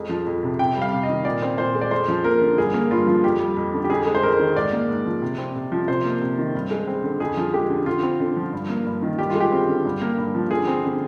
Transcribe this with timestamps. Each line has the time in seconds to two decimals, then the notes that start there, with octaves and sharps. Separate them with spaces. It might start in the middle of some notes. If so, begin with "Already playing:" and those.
Already playing: F2 G#3
0.09 F3
0.26 F2
0.43 C3
0.59 C3 G5
0.76 G3
0.82 F5
0.92 C3
1.03 D#5
1.09 D#3
1.25 A#2 D5
1.42 C4
1.58 A#2 C5
1.75 G#3
1.81 D5
1.91 F2 C5
2.08 F3
2.24 A#3 A#4
2.41 D3
2.58 G2 G#4
2.74 A#3
2.91 G2 F4
3.07 F3
3.24 F2 G4
3.40 G3
3.57 F2
3.73 D3
3.84 G4
3.90 F2 G#4
4.07 G#3
4.15 C5
4.23 F2 A#4
4.39 D#3
4.56 G#2 D5
4.73 A#3
4.89 G#2
5.06 F3
5.22 C3
5.38 C4
5.55 C3
5.72 F3
5.88 C3 C5
6.05 A#3
6.21 C3
6.38 D#3
6.54 G2
6.71 G#3
6.87 C4
7.04 D3
7.20 F2 G#4
7.37 F3
7.53 G#3 G4
7.70 D3
7.86 D3 F4
8.03 C4
8.20 D3
8.36 F3
8.53 G2
8.69 A#3
8.86 G2
9.02 D#3
9.19 G2 G4
9.30 F4
9.35 G#3
9.40 G4
9.52 C4
9.68 D3
9.85 G2
10.02 A#3
10.18 G2
10.35 F3
10.51 D3 G#4
10.67 C4
10.84 D3